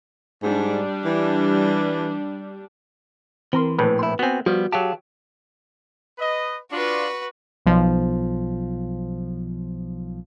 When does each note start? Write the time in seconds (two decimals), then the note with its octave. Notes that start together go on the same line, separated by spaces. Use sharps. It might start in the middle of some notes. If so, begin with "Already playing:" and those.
0.43 G#2 G3 D4
1.05 E3
3.53 E3 C4 A#4 C6
3.79 A#1 A2 B4
3.99 E4 C6
4.19 B3 C4 F#4 G#5
4.46 F3 G3 B3 F#4
4.72 F#3 G4 G#4 F5 A5
6.18 B4 D#5
6.71 D4 F4 F#4 B4
7.66 B1 F3